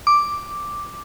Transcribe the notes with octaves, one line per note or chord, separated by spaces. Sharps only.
D6